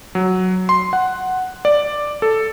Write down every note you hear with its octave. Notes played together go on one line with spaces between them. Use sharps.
F#3
C6
F#5
D5
A4